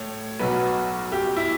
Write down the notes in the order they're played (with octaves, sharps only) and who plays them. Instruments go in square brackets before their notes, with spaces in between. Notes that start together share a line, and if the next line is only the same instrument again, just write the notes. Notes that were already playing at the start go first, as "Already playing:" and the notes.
Already playing: [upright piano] A2 C#5
B1 B2 F#3 B4
G4
E4